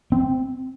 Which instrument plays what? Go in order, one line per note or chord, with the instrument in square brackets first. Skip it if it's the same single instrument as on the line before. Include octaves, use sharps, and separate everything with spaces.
[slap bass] C4